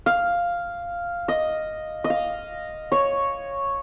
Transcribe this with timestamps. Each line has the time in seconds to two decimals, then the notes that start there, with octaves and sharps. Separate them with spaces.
0.06 F5
1.28 D#5
2.04 D#5
2.10 F5
2.92 C#5